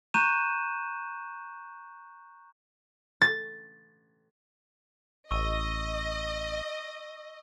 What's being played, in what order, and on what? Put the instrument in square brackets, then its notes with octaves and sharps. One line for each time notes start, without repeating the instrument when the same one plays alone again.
[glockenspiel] A#5 C#6 F#6 G6 D#7 E7
[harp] A6
[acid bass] A1 [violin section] D#5 [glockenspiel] C#6 E6 D#7